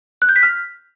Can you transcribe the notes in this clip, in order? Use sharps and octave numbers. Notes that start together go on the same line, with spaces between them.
F#6
G6
B6
F6